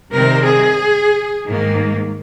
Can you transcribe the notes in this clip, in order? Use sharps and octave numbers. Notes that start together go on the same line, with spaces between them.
C3 D#3 G3 C4 A#4
G#4
G#2 D#3 A#3